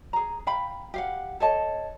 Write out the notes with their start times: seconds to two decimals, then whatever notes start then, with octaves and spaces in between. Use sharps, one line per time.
0.13 G#4 A#5
0.47 F5 G5 B5
0.94 G4 F5 F#5
1.40 A4 C#5 D#5 A5